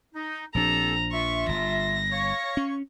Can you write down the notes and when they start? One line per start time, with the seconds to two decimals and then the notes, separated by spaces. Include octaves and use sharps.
0.13 D#4
0.55 A#1 F3 C4 D4 G4 A4 A#5
1.12 F4 E5 C#6
1.48 G1 A#6
2.11 C#5 F5 C#6
2.57 C#4